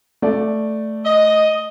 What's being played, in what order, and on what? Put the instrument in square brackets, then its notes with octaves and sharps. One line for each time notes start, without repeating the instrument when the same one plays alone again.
[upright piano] A3 D5
[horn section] D#5